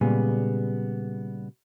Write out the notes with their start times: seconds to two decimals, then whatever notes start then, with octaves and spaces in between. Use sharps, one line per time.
0.01 A#2 C#3 G3 G#3 B3 G#4